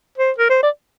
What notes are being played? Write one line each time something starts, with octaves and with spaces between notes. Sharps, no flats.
C5
A#4
C5
D5